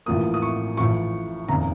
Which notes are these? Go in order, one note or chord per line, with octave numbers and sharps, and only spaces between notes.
A1 A2 F3 A#3 D#6
D#6
C#6
A1 A2 F3 C#6
F1 D#2 C#3 A#5